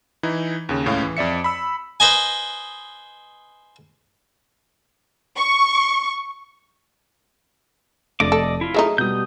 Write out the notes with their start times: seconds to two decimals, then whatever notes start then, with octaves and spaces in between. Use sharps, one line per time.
0.23 E3 D#4 E4
0.69 D#2 C#3
0.86 C#2 A2 C#4 F5
1.02 E3
1.17 F2 D5 E5 C#7
1.44 B5 E6
2.00 B4 C5 D#5 G#5
5.37 C#6
8.20 F1 D3 A3 D5 D#5 D6
8.32 A4
8.61 E4 F4
8.74 F#3 A3 D#4 G#4 D#5 E5
8.98 B2 G3 D#6 G6